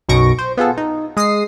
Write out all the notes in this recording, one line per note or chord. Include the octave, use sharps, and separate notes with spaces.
B1 F#2 B2 C#6 A#6 D7
C5
B3 F4 G#4 A4
D#4
G#3 D#6 A#6 C7